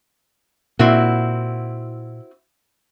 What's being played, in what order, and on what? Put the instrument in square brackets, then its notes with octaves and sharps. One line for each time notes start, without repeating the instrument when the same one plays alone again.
[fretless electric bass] A#2 [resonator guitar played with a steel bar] C4 E4 F#4